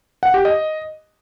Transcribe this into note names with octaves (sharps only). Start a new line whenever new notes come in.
F#5
G4
D#5